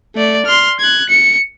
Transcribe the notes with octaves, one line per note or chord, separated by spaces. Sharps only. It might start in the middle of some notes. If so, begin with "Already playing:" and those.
A3 D5
C6 F6
F#6 G#6
C#7